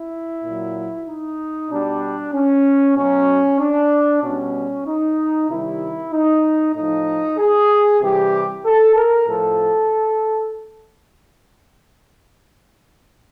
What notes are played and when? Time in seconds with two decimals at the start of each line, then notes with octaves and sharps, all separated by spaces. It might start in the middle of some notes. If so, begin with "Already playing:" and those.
Already playing: E4
0.44 A#2 F#3
1.08 D#4
1.71 B2 G3 D4
2.34 C#4
2.96 B2 F#3 C#4
3.60 D4
4.22 B2 C#4
4.28 G3
4.86 D#4
5.50 C3 D#3 G3 E4
6.13 D#4
6.75 A2 F3 D#4
7.38 G#4
8.01 C3 E3 G3 G4
8.65 A4
8.96 A#4
9.28 A2 F3 A4